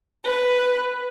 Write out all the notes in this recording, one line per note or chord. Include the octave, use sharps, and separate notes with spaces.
B4